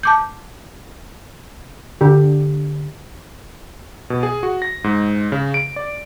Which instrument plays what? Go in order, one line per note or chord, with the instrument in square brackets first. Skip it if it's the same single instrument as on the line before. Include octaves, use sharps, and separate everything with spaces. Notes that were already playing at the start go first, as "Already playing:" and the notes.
[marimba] A5 D6 G6
[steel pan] D3 G4
[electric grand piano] B2
G#4
F#4
A#6
G#2
C#3
D7
D5